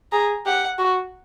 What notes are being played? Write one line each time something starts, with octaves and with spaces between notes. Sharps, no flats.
G#4 A#5
G4 F#5
F#4